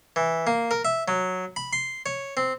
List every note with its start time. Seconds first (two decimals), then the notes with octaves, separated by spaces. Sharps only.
0.16 E3
0.47 A#3
0.71 A#4
0.85 E5
1.08 F#3
1.56 B5
1.73 C6
2.06 C#5
2.37 C4